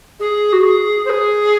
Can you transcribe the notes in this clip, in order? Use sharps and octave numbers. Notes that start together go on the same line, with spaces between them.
G#4
F#4
G#4
C5
G#4